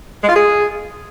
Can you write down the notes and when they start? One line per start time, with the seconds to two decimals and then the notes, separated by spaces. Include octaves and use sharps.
0.23 G#3
0.29 F4
0.34 G#4